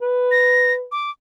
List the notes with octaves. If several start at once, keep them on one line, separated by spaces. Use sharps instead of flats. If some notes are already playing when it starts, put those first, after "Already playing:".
B4
A#6
D6